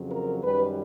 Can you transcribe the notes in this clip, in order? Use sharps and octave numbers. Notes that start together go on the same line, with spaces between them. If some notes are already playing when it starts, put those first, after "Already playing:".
Already playing: F2 C#3 F#3
A#4
F#2 D#3 G3 B4